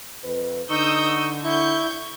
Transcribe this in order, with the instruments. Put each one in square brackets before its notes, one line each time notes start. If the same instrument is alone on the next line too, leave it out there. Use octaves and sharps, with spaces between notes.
[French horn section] F2 B4
[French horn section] D3 [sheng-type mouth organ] D#4 C#6 [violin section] D#6 E6 G6
[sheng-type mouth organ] E4 [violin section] C#6 G6